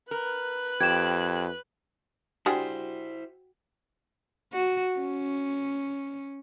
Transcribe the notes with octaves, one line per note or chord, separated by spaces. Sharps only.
A#4 B4 F#6
F2 G4 G#6 E7
G3 D4 E4 F#4 G#4 C5 F#5 G5
F#4
C#4